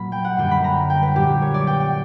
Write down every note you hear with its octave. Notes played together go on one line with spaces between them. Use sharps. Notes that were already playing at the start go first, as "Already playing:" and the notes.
Already playing: A#2 F#3 A#3 B5
G5
F#5
F#2 D3 G3 A#3 G5
B5
A#5
G5
B4
A#2 F#3 A#3 G4
C#5
D5
G5
G5